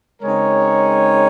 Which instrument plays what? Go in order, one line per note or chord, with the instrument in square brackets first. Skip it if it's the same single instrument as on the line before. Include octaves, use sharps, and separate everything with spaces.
[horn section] C#3 G#3 C4 D#4 A#4 C#5